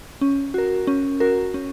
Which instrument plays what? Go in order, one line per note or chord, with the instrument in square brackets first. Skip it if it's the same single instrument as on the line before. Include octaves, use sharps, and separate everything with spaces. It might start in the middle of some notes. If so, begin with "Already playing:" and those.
[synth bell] C#4
F#4 A#4
C#4
F#4 A#4
C#4